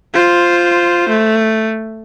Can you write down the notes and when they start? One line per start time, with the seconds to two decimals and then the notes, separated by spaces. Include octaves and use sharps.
0.13 F4 C5
1.09 A3